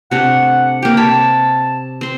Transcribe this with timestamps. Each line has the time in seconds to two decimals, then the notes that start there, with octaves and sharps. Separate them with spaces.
0.11 C3 A3 D4 F#5
0.82 A#3 G4 G5
0.97 C3 C#5 A5 B5
2.01 C4 C6